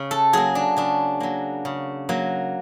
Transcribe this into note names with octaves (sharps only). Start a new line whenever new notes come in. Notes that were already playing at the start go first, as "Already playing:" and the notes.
Already playing: C#3
A4
F#3 A#3 G#4
D4
C#3 D4
F#3 A#3
C#3
F#3 A#3